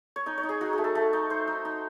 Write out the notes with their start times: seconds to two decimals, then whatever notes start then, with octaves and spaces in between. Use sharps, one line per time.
0.16 C#5
0.26 D#4 D#5
0.38 C#5
0.43 D#4
0.49 G#4
0.61 D#4 F#4
0.73 A3 G#4
0.84 A4
0.95 A3 A4
1.13 D#4
1.30 D#4 C5
1.47 D#4
1.65 D#4